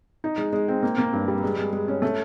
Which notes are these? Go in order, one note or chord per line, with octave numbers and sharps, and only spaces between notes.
D#4
G#3
G#3
C4
A#3
A#3
G2
G3
G#3
G#3
G#3
C#4
A3